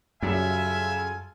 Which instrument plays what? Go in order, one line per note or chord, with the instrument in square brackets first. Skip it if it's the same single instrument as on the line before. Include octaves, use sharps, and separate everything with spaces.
[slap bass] F#2 [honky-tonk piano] C#3 F#3 G3 [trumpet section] F4 A4 G#5 [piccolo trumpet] E5